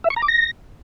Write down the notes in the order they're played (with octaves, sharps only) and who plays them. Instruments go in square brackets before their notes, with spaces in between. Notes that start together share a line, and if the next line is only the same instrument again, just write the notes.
[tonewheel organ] E5
C#6
A#5
D6
A#6